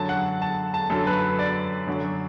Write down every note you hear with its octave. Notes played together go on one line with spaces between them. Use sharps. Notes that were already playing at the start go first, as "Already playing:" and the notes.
Already playing: F#2 D3 F#3 A5
F#5
A5
A5
F#2 D3 F#3 A4
B4
D5
F#2 D3 F#3